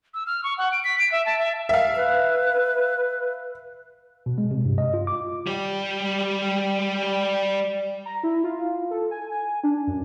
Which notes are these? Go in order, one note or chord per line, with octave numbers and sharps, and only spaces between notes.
E6
F6
C#6
F#5
D7
B6
D7
E5
A5
E5
E5 F5
B4
B2
G#3
C3
G2
D#5
F4
D6
G3 G4
A#5
E4
F4
A4
G#5
G#5
D4
F#2